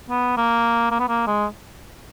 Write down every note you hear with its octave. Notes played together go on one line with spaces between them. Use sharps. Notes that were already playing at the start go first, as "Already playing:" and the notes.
B3
A#3
A#3
B3
A#3
G#3